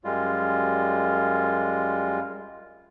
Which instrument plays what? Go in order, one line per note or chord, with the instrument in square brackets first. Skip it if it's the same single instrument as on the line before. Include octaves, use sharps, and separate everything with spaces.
[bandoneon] F#2 G3 G#3 F4